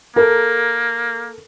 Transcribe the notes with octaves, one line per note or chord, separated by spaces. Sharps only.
A#3 A4 A#4